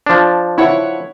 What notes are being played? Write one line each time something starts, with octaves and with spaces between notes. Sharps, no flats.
F3 D4
E4 C#5 F#5